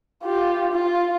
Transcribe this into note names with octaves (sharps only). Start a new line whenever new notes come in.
F4 G4
F4